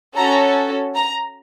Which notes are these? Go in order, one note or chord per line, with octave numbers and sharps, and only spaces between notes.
C#4 F#4 A4 A#5
A#5